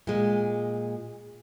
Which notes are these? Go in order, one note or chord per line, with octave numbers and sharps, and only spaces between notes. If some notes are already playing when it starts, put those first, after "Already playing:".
A#2 G#3